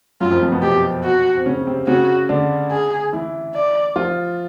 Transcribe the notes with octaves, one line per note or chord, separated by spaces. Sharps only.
F#2 F#3 F4
F2 F3
F2 F3
B2 B3
C3 C4 G4
F#4
C4
C#3 C#4
C3 C4
C#3 C#4 F#4
D3 D4
G#4
E3 E4
D5
F3 F4